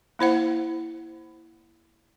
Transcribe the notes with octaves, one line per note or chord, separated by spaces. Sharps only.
A#3 E4 C5 F#5